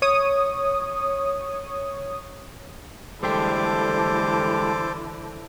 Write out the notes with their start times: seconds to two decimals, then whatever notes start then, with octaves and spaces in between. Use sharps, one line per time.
0.02 C#5 D#6
3.23 D3 E3 G3 G#3 G4 A4 C5 D6